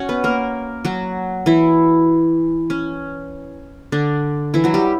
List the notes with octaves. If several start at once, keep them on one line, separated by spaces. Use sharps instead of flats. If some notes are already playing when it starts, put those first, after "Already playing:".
Already playing: C#4 F#4 C#5 F#5
B3 B4
A#3 A#4
F#3 F#4
E3 E4
C#4
D3 D4
E3 E4
F#3 F#4
G3 G4